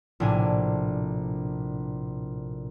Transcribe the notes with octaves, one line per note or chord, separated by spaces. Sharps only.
A#1 A2 C3 D4 G#5